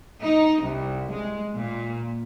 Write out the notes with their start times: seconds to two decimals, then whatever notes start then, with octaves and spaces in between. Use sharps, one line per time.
0.22 D#4
0.62 C2
1.13 G#3
1.55 A#2